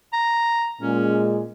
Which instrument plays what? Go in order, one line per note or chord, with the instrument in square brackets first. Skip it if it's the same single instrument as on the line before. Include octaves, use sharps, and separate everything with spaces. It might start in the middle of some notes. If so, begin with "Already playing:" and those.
[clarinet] A#5
[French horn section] A#2 G#3 [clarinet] C#4